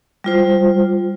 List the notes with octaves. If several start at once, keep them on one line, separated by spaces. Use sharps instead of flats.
G3 F4 C5